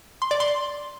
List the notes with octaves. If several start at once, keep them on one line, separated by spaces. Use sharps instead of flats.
C6
D5
C6